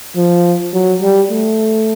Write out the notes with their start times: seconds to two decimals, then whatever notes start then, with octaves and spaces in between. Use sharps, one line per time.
0.16 F3
0.73 F#3
1.02 G3
1.30 A3